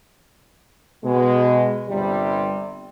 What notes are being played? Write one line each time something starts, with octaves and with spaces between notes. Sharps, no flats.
B2 G#3
G1 C3 G3